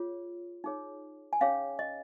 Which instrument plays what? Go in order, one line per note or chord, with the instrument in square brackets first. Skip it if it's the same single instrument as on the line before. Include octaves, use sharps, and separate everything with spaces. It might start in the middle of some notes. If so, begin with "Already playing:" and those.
Already playing: [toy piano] F4 G#4 C#5
D#4 G#4 C#5
G#5
C#4 G#4 C#5 F5
D#5